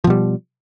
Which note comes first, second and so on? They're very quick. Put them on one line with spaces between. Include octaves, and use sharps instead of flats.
F3 B2 G3